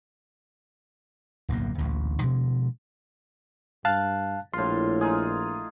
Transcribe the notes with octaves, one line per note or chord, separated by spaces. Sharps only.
D1 B1 F#2 A#3
A1 D2 A#2
B2 D3 F3 G#3
G2 F5 A5 F#6
A#1 A2 F4 C6
D#4 F4 G#4